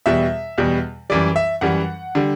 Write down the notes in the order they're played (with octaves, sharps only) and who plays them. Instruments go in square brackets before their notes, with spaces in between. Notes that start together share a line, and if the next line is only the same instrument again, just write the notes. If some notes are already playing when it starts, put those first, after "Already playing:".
[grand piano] E2 B2 G3 E5
E2 B2 G3
F#2 E3 G3 D5
E5
F#2 E3 G3 F#5
D3 G3